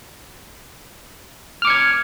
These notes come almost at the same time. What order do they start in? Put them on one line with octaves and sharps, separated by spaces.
F6 D6 C#7 G#6